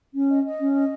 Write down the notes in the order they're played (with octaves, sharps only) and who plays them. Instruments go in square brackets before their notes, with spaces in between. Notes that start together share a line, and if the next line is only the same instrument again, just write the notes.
[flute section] C#4
D#5
D#5
C#4
D#5